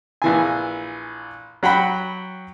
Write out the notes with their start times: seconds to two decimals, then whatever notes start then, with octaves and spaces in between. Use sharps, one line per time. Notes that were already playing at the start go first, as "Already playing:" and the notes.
0.22 A#1 E3 G#5
1.63 F#3 F#5 G5 B5